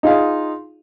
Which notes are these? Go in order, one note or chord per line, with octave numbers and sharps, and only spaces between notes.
D#4 F4 G#4 D#5 F5